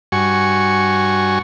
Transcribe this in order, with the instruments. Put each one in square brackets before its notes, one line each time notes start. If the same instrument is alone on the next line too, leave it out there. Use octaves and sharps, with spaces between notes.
[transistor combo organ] G2 F#4 G#5 C#6